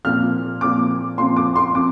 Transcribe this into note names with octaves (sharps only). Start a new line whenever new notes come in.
A#2 F3 C4 F6
A#2 F3 C4 D6
A#2 F3 C4 C6
D6
C6
F3 C4 D6